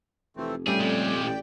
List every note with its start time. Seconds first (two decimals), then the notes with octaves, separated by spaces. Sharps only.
0.37 F1 E3 A3 C4
0.67 G3 A3 C#4 G4 G#4 D5 G5
0.79 F2 A#2 G#3
1.23 A1